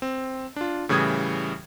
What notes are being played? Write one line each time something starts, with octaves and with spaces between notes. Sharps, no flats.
C4
D4 F4
A2 C#3 E3 G3 D#6 G#6